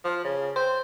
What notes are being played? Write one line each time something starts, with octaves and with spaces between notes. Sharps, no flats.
F3
C#3
C5